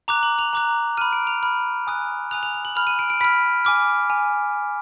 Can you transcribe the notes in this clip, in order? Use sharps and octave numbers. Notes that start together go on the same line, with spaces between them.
A#5 D6 F#6 F7
F#7
F7
A#5 D6 F#6
B5 F6 D#7
D7
F7
B5 F6
G#5 D#6 F#6
G#5 D#6 F#6 F7
F7
F7
F#7
B5 F6 F7
D#7
D7
D7
B5 F6 B6
G#5 D6 F6
G#5